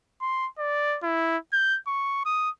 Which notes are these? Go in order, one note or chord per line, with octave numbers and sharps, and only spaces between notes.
C6
D5
E4
G6
C#6
D#6